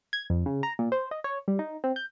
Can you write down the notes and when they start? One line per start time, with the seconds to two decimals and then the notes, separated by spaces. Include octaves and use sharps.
0.13 G#6
0.30 F2
0.46 C#3
0.63 A#5
0.79 A#2
0.92 C5
1.11 D#5
1.24 C#5
1.48 G3
1.59 D#4
1.84 C4
1.96 G6